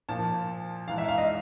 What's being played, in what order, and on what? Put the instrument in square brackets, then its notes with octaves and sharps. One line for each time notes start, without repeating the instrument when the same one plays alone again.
[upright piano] A#2 F3 A5
G#2 E3 F5
E5
F5
D#5